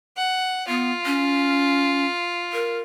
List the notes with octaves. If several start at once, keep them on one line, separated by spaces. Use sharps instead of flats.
F#5
B3 F4
C#4
A#4